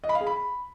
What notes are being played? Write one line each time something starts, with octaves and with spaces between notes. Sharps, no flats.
D#5
B5
F5
G#4
B5